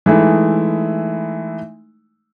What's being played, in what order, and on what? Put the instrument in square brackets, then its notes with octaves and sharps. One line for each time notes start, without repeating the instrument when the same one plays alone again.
[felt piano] E3 G#3 A3 D#4 E4